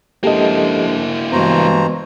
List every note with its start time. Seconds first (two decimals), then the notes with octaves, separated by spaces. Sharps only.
0.24 F3 G#3 A#3 D4 E4 G4 A4 D#5
1.32 G2 E3 G#3 B3 F#4 C5 A#5